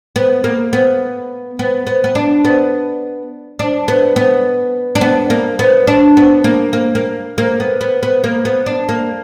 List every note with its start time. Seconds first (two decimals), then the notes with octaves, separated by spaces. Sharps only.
0.16 B3
0.44 A#3
0.73 B3
1.59 B3
1.87 B3
2.04 B3
2.15 D4
2.45 B3
3.59 D4
3.88 B3
4.16 B3
4.95 D4
5.01 B3
5.30 A#3
5.59 B3
5.87 D4
6.17 B3
6.44 A#3
6.73 A#3
6.95 A#3
7.38 A#3
7.60 B3
7.81 B3
8.03 B3
8.24 A#3
8.45 B3
8.66 D4
8.89 A#3